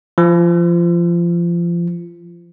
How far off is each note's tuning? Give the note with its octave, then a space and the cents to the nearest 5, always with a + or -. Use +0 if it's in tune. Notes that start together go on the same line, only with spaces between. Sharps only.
F3 -25